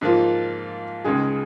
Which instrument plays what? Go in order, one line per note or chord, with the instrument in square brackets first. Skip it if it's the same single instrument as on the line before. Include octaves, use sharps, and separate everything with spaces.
[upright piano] G#2 F3 A#3 F4
C#2 C#3 G#3 D#4 G#4